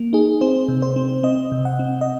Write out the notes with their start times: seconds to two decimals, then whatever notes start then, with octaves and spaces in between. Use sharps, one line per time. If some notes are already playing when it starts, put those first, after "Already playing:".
Already playing: A#3
0.13 D#4 G#4
0.41 C4 C5
0.68 C3
0.82 C5
0.96 C4
1.23 C4 D#5
1.52 C3
1.65 F#5
1.79 C4
2.01 D#5